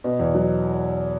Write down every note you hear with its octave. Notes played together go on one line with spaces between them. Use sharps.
B2
E2
F#3